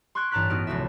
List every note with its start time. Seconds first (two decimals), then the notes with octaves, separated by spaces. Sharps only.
0.15 C6 C#6 E6 F#6 G#6 D7
0.31 A1 G2 A5 A#5 F#6 B6
0.50 B3 D#4 F#4 F6 D7
0.67 F1 C#2 F#4 E5